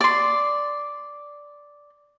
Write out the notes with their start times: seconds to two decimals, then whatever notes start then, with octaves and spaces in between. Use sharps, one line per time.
0.01 D5 C6